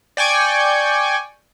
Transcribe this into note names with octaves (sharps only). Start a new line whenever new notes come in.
D5 G5 G#5 C#6